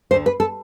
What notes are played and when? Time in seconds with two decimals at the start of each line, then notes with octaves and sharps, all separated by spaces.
0.11 D2 D3 C5
0.26 B4
0.40 A4